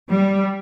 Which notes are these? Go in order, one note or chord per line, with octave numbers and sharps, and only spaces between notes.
G3